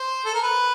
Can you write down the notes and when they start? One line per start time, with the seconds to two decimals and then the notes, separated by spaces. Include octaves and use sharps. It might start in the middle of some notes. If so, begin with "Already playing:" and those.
Already playing: C5
0.25 A4
0.34 A#4
0.43 B4